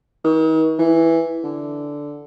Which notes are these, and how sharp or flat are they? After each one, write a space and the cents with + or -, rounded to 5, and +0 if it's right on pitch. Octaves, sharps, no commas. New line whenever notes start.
D#3 +40
E3 +0
D3 -5